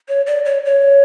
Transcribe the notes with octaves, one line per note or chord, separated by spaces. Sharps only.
C#5
D5
C#5
C#5